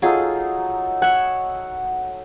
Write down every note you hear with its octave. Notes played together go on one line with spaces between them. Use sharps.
F#3 D#4 F4 G#4 A4
C#5 E5 F#5